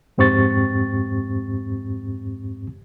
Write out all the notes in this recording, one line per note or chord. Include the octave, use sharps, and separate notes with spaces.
F2 G#2 C4 G4 C#6 A6